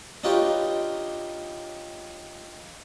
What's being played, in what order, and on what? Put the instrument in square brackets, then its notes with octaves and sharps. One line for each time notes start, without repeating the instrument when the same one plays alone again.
[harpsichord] D4 D#4 F4 G4 B4 C#5